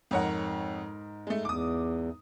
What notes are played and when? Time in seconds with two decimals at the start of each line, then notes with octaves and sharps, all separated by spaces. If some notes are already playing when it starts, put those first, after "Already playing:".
0.11 F2 G#2 A#4 C#5 F#5
1.27 G#3 A3
1.45 E2 D6 D#6